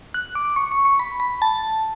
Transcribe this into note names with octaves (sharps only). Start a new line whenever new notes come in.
F#6
D6
C#6
C#6
C#6
B5
B5
A5